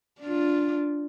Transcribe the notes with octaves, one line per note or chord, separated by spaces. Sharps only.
D4 F4